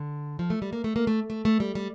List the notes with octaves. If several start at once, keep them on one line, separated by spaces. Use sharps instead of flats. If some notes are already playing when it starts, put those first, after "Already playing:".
Already playing: D3
F3
A3
G3
A#3
A3
A#3
A3
A3
A3
G3
G3